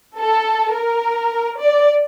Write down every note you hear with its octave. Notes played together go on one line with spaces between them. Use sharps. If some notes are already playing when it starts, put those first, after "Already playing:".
A4
A#4
D5